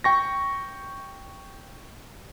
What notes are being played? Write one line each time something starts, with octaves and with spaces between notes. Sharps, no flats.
G5 C#6 A#6